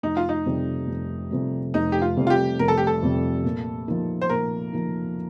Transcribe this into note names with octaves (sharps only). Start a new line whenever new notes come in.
F1 D#4
F4
D#4
F2 C3 G3
F1
F2 C3 G3
F1 D#4
G4
F4
F2 C3 G3
F4
G4
F1 A#4
A4
G4
A4
F2 C3 G3
A#2
F3 A#3 D#4
C5
A#2 A#4
F3 A#3 D#4